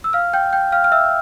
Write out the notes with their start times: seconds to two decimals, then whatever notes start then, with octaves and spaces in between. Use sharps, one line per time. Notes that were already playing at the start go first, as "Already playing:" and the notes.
0.04 E6
0.13 F5 F6
0.33 G5 G6
0.53 G5 G6
0.72 F5 F6
0.84 F6
0.92 E5 E6